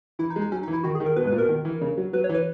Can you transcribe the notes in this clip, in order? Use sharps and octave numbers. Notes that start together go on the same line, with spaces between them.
E3 E4
D#4
G#3
D#4
F#3 C#4
D#4
E3
E4
D#3 F#4
G#4
D#3
A#4
B2 B4
G#2
B4
A#2
B2 A#4
D#3
E3
C#3
F#3
F#3 B4
C#5
E3
B4